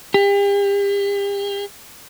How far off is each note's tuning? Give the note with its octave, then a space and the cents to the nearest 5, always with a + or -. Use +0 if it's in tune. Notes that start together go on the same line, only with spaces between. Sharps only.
G4 +40